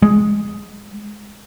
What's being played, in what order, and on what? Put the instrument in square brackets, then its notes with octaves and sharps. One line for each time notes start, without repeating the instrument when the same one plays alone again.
[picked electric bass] G#3